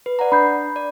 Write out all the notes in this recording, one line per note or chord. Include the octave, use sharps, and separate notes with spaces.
B4
D5 F#5 A#5
D4 B5 G6 C7
D5